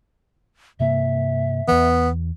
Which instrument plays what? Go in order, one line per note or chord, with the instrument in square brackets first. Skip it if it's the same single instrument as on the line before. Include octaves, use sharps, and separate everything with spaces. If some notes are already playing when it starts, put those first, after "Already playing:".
[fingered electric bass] G2 C3 A#3 [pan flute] E5
[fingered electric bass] E2 E3 [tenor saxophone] B3